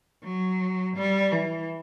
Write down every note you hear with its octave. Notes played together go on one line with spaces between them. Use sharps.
F#3
G3
E3